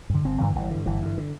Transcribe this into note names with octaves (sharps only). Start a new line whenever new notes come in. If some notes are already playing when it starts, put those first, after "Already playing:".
G2 D3
G1 C4
G2 D3 E3
G1 E3
G2 D3
G1 E3
G2 D3
D3